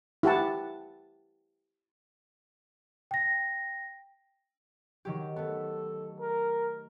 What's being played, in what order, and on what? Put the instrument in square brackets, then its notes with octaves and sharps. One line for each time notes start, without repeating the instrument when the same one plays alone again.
[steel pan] E4 G4 F#5 A5
[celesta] G5 A#6
[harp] D#3 F#3 G4
[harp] A3 B3 [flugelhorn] A4
[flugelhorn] A#4